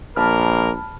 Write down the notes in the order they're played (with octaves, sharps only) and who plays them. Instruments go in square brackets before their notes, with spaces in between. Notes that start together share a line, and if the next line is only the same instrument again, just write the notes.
[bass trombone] A#1 [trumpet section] A#3 A#4 [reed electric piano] A5 B5 F6